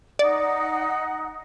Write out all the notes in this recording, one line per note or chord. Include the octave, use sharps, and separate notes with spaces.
D#4 D5 F#5